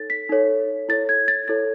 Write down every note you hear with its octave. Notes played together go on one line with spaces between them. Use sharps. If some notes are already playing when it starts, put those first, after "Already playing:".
Already playing: D#4 A4 C#5 A6
B6
D#4 A4 C#5
E4 A4 C#5 A6
G#6
A6
E4 A4 C#5 A6